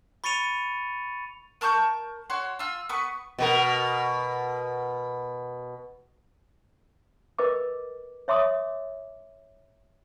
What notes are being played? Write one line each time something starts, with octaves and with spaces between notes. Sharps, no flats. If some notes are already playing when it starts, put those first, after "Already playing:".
B5 C#6 A6 C#7 D#7 F7
A#4 A5 C#6 G6
F#4 C#5 C6
F4 E6
B3 B4 C#6
B2 F#4 A#4
A#4 B4 D#5 D6
C#5 E5 C6 D6 D#6